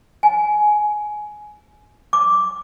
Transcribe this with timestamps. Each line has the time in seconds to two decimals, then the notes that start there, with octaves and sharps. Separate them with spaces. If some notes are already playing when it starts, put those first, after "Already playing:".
0.23 G#5
2.13 D6